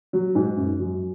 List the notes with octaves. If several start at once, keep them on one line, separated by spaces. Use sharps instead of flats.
F#3
G#2
F#2
F#3